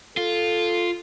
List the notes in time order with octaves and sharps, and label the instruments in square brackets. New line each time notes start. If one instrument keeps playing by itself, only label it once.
[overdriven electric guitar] F4 [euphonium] A4